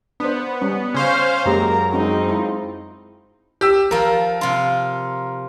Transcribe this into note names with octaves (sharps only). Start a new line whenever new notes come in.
B3 D4 C5
G3 C#4
C#3 C#4 C5 F5
F#2 G#3 A#3 G4 A#4 A#5
G#3 C4 C#4 D#4 F#4
G#3 E4 F4
G4 E6
F3 A4 A#4
C3 F4